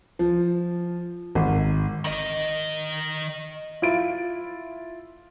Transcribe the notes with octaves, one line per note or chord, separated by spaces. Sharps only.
F3
G#1
D#3 D#5
E4 F4 D7